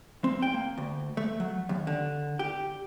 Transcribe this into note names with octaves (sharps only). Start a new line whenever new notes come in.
C4
G5
A#3
D2
A3
F#3
D#2
D3
G4